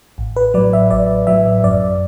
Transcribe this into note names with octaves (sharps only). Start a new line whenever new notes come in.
A1
B4
A2 F#3 D5
E5
A1 D5
A2 F#3 E5
F#2 D5